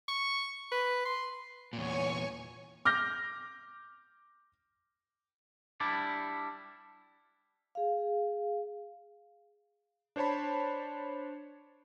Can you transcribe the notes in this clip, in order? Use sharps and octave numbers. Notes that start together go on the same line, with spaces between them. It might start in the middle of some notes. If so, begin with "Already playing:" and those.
C#6
B4
C6
E2 A#2 C#5 G#5 C#6
D6 F6 G6 A#6
G3 D4 E4 D5
G#4 F5
D4 C5 C#5 A5 B5